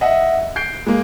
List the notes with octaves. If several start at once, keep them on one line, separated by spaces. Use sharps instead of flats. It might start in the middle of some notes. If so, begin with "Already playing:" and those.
D#5 E5 F#5
G6 C7 D7
G#3 A#3